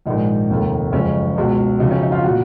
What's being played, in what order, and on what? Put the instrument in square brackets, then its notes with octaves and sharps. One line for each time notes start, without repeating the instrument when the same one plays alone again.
[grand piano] A#1 G#2 D#3 G#3 D#4
F1 D#2 D#3
F#1 F2 C#3 G#3 C#4
C#2 B2 G#3
F2 C#3 F#3 D#4
C#4
D#4
F4
A#2 F3 F#4